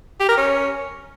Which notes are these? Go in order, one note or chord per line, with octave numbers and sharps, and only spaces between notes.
G4
A#4
C#4